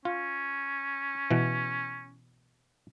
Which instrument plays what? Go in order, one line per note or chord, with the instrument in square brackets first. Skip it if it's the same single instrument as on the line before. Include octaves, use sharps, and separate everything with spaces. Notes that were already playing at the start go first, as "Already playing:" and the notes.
[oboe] C#4 [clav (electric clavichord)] F4
[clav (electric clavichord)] B2 E3